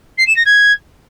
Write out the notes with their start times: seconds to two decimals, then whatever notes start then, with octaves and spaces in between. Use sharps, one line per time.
0.18 C7
0.27 E7
0.36 A#6
0.46 G#6